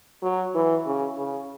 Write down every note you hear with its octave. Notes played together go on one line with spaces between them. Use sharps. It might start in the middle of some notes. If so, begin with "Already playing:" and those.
F#3
E3
C#3
C#3